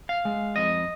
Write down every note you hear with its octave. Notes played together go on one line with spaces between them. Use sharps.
F5
G#3
F2 D#5